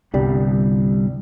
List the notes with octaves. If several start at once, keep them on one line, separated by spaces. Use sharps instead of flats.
G1 C2 G2 G3